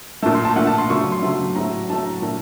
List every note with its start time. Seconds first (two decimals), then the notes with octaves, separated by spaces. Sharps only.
0.22 A#2 A3 A5
0.35 C6
0.45 A5
0.56 A#2 A3 F#5
0.67 A5
0.78 C6
0.89 C#3 F#3 A3 C#6
1.01 C#6
1.12 C6
1.23 C#3 F#3 A3
1.56 A2 F#3 A3 A#5
1.89 A2 F#3 A3 A5
2.05 A#5
2.22 A#2 A3 A5